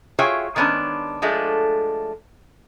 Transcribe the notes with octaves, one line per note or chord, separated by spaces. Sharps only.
F4 F#4 G#4 C#5 E5 G5
D#3 G#3 B3 C#4 D4
F3 G#3 A3 D4